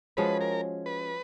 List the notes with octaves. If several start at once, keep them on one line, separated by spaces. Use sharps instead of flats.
F3 G#3 C#4 F#4 B4
A#4
B4